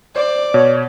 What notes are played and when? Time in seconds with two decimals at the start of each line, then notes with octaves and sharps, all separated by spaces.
0.16 C5 D5
0.54 B2 C#5